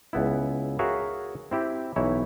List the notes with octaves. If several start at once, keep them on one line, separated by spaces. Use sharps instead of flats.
C#2 B3 E4
F#4 G#4 A#4 C#5 E5 F5
C4 E4 G4
B1 E3 D#4 E4 C#5